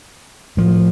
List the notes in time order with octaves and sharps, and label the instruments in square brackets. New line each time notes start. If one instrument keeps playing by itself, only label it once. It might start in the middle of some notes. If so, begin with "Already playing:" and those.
[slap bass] A2 F3